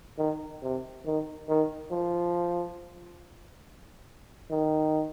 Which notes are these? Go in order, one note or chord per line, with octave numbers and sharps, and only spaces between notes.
D#3
C3
D#3
D#3
F3
D#3